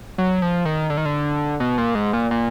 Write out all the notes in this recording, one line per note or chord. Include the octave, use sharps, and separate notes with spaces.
F#3
F3
D#3
D3
D#3
D3
B2
A#2
G#2
A#2
A#2